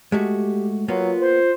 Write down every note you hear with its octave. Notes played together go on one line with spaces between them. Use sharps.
G#3 A3 F#4 G4
F#3 A#3 B3 F4
C5